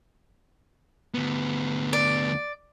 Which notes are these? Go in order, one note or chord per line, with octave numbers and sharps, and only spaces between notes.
D2 B3
D5